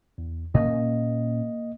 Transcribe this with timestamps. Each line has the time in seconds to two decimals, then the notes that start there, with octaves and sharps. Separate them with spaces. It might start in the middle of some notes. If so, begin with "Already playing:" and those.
0.18 E2
0.54 A#2 A#3 C#4 D#5